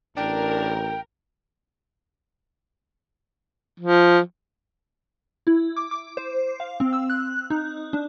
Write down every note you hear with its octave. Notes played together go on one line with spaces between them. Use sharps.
A1 D4 A#4 G5
F3
E4
D6
D6
C5
F5
C4
E6
F#6
D#4
D4